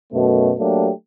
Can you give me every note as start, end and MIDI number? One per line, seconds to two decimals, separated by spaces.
0.13 0.53 42
0.13 0.53 47
0.13 0.53 57
0.59 0.91 54
0.59 0.91 57
0.59 0.91 58
0.59 0.91 62
0.59 0.91 67